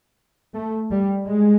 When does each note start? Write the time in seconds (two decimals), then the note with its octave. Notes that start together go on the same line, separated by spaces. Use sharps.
0.54 A3
0.90 G3
1.27 G#3